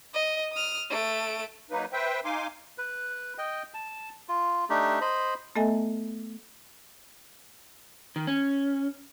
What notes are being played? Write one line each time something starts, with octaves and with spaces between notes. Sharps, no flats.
D#5
D#6 F6
A3 D7
F#3 A#3 D#4 B4
B4 C5 E5 G5
D#4 F5 G#5 C6 D6
B4
D#5 G5
A5
F4
A3 D4 D#4 G4
C5 D#5 B5
A3 B3 A4 D#5 E5 G#5
D#3
C#4